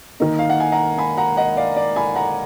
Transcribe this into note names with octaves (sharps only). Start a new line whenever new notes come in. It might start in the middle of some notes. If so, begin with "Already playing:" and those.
D#3 A#3 D#4
F5
F#5
G#5
F#5 A#5
G#5 B5
F#5 A#5
D#5 F#5
D5 F5
D5
G#5 B5
F#5 A#5